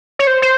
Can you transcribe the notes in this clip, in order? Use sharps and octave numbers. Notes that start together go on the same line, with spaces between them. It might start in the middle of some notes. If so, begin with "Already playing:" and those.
C#5
C5
C5